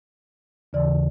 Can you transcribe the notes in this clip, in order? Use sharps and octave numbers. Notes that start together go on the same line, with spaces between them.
D#2 C#3 E3 D5